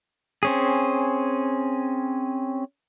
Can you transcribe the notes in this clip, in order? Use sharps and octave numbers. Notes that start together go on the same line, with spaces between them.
C4 C#4 G#4